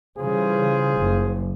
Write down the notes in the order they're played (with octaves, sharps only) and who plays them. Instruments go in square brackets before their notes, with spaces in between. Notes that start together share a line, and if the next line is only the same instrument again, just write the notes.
[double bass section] C#3 E3 G3 [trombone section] F4 G#4 C5
[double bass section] F#1